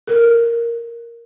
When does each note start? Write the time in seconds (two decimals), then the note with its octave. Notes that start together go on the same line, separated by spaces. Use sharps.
0.07 A4 A#4